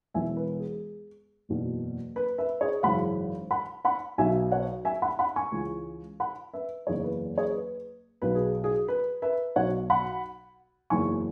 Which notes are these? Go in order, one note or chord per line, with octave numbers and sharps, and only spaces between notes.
E1 E2 E3 E5 G#5
B4
G#4
F#1 E2 B2
B4
B4 E5
G#4 C#5
G#1 F#2 C#3 E3 F#5 B5
F#5 B5
F#5 B5
B1 B2 E5 G#5
C#5 F#5
E5 G#5
F#5 B5
F#5 B5
G#5 C#6
C#2 C#3 E3
F#5 B5
B4 E5
F#1 E2 C#3 G#4 C#5
B4
G#4 C#5
B4
B1 B2 B4
G#4
G#4
B4
B4 E5
B1 B2 C#5 F#5
F#5 B5
F#1 E2 C#3 E3 G#5 C#6